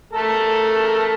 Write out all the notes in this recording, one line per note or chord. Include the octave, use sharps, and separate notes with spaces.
A3 A4 A#4